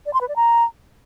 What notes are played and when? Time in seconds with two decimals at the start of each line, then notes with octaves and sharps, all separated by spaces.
0.06 D5
0.13 C6
0.21 B4
0.28 D5
0.36 A#5